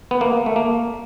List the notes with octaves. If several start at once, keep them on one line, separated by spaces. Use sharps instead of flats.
B3
A#3
A3
A#3